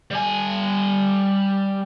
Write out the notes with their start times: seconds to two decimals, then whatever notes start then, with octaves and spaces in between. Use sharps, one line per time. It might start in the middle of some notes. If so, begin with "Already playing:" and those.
0.11 G3 G#5